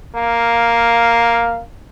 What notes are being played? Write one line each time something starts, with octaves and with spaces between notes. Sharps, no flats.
A#3 F5